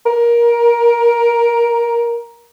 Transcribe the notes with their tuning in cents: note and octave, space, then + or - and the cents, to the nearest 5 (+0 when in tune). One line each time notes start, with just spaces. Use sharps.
A#4 +15